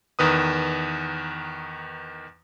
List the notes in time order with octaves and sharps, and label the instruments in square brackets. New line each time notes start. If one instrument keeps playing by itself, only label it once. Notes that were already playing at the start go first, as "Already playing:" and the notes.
[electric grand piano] E2 D#3 B4 D#6